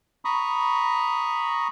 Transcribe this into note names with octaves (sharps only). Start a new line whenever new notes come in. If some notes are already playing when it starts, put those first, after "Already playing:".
A#5 B5 C#6 D#6